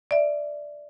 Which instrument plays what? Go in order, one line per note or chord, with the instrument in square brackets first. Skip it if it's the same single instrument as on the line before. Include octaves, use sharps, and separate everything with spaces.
[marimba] D5 E5